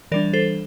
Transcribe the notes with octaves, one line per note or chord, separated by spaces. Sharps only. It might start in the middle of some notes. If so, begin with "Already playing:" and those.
E3 G3 D4 A#4 D5
A4 C5